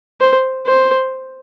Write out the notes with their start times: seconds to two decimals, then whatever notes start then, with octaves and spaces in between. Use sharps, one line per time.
0.21 C5
0.66 C5